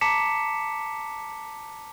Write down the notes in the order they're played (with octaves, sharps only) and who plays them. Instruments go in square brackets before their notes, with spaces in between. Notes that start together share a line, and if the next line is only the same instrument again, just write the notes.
[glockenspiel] A5 A#5 D6 B6 C#7 E7